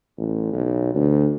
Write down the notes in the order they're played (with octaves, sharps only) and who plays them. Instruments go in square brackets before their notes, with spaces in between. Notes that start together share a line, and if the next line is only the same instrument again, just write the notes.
[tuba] A1
B1
D2